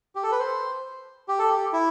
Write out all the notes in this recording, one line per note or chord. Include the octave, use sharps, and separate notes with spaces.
G4
A4
B4
C5
G4
A4
G4
E4